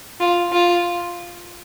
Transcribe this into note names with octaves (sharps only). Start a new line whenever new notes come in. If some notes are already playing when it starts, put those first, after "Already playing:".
F4
F4